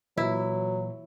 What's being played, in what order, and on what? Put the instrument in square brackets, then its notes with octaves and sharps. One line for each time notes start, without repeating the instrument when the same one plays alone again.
[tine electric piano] A#2 E3 [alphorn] F#3 [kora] E4